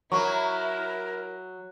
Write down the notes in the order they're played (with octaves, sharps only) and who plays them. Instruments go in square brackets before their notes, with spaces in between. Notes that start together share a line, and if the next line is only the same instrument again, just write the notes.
[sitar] F#3 [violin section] E4 [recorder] A#4 [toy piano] C#6